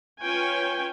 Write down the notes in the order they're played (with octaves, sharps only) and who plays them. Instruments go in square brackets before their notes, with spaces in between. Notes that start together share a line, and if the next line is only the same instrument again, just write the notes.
[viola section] C#4 F4 B4 C#5 G5 G#5